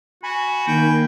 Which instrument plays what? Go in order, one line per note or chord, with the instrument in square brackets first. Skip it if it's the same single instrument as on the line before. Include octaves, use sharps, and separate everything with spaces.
[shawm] F#4 [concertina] G#5 B5
[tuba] D#3 [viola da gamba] A#3 [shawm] G5